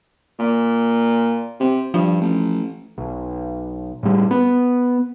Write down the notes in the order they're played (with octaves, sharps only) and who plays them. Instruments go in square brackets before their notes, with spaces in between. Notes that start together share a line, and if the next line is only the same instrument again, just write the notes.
[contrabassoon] A#2
C3
[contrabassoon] G2 [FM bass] F3
[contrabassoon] A1
[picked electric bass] B1
A2 G3
B3